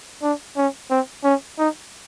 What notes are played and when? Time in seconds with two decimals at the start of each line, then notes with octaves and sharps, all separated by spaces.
0.23 D4
0.57 C#4
0.90 C4
1.24 C#4
1.58 D#4